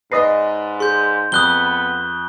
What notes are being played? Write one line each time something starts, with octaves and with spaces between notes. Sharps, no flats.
G#2 B4 D5 D#5 D#6 A#6 C7
G#4 C6 G6
F2 B3 D#6 F#6 G7